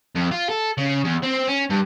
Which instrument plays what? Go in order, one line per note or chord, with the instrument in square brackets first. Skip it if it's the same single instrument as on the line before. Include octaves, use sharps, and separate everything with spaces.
[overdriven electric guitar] F2
F4
A4
C#3
E2
C4
C#4
G2